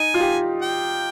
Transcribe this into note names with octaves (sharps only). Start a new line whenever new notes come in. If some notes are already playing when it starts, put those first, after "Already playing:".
Already playing: D#4 G#5
F4
G4
G5